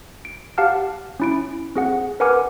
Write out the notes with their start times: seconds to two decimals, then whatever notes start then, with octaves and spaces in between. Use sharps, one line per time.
0.25 D7
0.58 G4 F5 F#5 A5 F6
1.20 C#4 E4 D7
1.75 C4 G#4 F#5
2.20 A#4 B4 F#5 G#5 D6 F6